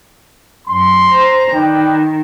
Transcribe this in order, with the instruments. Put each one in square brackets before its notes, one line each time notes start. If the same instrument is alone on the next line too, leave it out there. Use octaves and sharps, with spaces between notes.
[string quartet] F#2 [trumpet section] C6
[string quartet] C5 A#5
[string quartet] D#3 [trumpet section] B4 D5 G5